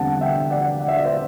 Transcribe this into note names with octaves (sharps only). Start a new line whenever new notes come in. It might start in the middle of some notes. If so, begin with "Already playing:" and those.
Already playing: E2 D3 G3 C4 F#5 A5
F#5
E5 G5
D5 F#5
F#5
E5
D5
C5 E5